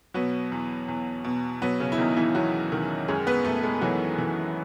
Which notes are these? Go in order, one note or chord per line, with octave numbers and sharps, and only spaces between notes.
B2 F#3 B3
E2
E2
B2
B2 F#3 B3
C#3 C#4
E4
E2 D#3 D#4
E3 E4
E2 F#3 F#4
D#3
F#2 G#3 G#4
B3 B4
F#2 A3 A4
G#3 G#4
E3 F#3 F#4
E3